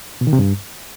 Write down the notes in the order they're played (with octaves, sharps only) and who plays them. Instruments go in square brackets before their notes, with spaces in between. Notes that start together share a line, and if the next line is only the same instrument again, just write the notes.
[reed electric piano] B2
D#3
C3
G2